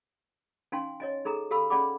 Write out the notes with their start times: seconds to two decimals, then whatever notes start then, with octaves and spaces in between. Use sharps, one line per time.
0.72 C#4 D#4 F5 G5 G#5 C6
1.00 C#5 D#5 G#5
1.25 D#4 G#4 A4 A#5
1.51 G4 A4 F5 B5 E6
1.70 C#4 G#4 D5 F#5 B5 D6